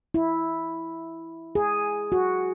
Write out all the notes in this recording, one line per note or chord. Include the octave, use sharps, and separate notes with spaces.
E4
G#4
F#4